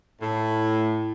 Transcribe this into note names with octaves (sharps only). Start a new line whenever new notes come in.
A2